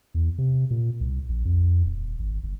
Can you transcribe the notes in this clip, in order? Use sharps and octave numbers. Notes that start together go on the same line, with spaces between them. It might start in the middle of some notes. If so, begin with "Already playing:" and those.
E2
C3
A#2
C2
A#1
F2
D#1
G#1
G1